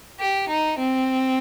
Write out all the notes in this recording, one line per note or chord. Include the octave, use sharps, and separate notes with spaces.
G4
D#4
C4